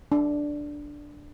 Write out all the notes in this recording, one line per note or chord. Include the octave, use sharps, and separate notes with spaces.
D4